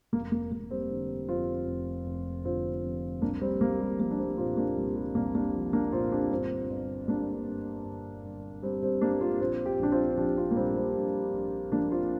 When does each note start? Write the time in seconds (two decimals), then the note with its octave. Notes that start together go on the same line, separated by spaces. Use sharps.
0.13 F1 A#3
0.32 A#3
0.52 F1 A#3
0.71 G3 C4
0.90 D3
1.28 F2 C4 F4
1.67 F1
2.06 F1
2.45 D3 C4 F4
2.83 F2
3.22 C2 A#3 D4
3.41 G3 C4
3.60 C2 A#3
3.80 G3
3.99 F3 A#3
4.11 D4
4.19 G3 C4
4.38 A#2 C4 F4
4.57 A#3 D4
4.77 C2 G3
4.95 G3
5.15 C2 A#3
5.35 A#3 D4
5.54 F3
5.73 A#3 D4
5.92 A#2 C4 F4
6.11 D4 G4
6.31 G1 C4 F4
6.70 G1
7.08 G3 A#3 D4
7.47 G2
7.85 G1
8.24 G1
8.63 G3 C4
8.83 G3 C4
9.01 G2 A#3 D4
9.21 C4 F4
9.40 A#1 C4 F4
9.66 G4
9.79 A#1 D4 G4
9.92 C4 F4
10.17 F3 D4 G4
10.37 C4 F4
10.51 A#3
10.56 A#2 G3 C4
10.76 G3 C4
10.95 A#1
11.33 A#1
11.72 F3 A#3 D4
11.92 C4 F4